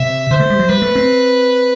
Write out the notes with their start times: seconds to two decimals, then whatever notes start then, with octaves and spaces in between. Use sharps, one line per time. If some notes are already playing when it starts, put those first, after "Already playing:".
Already playing: C3 E5
0.31 D3 C5
0.40 A3
0.50 G3
0.59 F#3
0.69 G3 B4
0.82 A3
0.95 C4